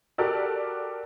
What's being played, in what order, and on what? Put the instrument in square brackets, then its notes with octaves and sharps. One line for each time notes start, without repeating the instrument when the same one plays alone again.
[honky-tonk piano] F#4 G4 A4 A#4 D5